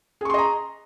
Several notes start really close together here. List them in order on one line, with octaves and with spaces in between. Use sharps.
G#4 C#6 C6 D#5 A#5